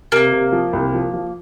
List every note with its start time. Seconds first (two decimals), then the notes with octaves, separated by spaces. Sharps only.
0.12 C3 A#3
0.32 C3
0.52 F3
0.73 C2
0.94 F3
1.14 F3